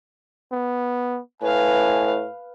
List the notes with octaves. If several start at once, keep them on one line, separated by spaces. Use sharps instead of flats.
B3
A2 B4 F5 G#5